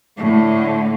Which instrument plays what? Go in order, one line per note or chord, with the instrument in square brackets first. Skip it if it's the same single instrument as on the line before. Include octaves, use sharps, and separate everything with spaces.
[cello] A2 D3